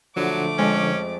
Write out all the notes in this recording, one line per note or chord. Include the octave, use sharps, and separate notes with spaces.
D3 F3 F#3 A3 D6
F2 G#3 C#4